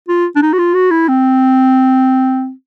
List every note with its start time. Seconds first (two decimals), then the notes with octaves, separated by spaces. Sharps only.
0.09 F4
0.36 D4
0.43 D#4
0.53 F#4
0.59 F4
0.75 F#4
0.91 E4
1.08 C4